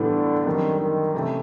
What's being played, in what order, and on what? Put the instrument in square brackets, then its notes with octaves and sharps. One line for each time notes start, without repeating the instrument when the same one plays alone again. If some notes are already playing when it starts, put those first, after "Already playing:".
Already playing: [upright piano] A2 E3 G3 B3 D4 [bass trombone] D3
[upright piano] F#2 D3 G3 C4 [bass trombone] D#3
[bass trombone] D#3
[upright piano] C3 E3 A3 C#4 E4